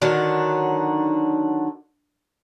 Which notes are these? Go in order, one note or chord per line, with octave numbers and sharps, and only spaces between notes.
D3 D#3 F#3 D4